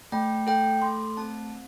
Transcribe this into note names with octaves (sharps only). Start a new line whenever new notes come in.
A3 G5
A4 G5
A3 C6
C4 A5